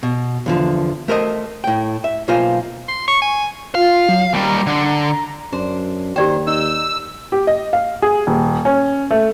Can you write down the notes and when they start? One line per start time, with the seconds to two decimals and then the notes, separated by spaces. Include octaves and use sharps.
0.03 B2
0.46 E2 D3 F3
1.08 A3 A#4 C5 D#5
1.64 A2 G5
2.04 E5
2.28 B1 A#3 F4 C5 F5 G#5
2.88 C6
3.08 C#6
3.22 G#5
3.75 F4 F5
4.09 F#3
4.34 D#2 G3 A#5
4.66 D3
5.53 F#2 D4 C5
6.16 D#2 D#3 G4 C5 D5 G5
6.47 D#4 E6
7.32 G4
7.47 D#5
7.73 F5
8.02 G#4
8.27 D#1
8.65 C#4
9.11 A3